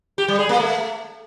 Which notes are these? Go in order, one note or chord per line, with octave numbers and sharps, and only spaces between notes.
G4
G3
G#4
A#3
A3